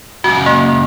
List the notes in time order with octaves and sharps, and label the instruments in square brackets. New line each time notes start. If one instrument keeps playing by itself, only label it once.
[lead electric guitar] C#2 F#2 [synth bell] F#4
[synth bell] A#3